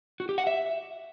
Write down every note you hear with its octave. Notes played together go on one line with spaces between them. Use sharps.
F#4
G4
F#5
E5